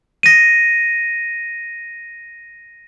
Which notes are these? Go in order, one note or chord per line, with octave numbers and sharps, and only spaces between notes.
A#6 D#7